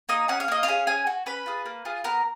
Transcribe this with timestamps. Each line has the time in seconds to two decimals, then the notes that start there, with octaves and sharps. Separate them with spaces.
0.09 A#3 D#4 D#5
0.28 C#4 G#4 F#5
0.40 F5
0.48 A#3 D#5
0.63 F4 F5
0.68 C#4 G#4
0.87 C#4 G#4 G#5
1.07 F#4
1.26 C#4 B4 B5
1.46 F4 G#4
1.66 A#3
1.85 F4 G#4
2.04 B3 A#4 A#5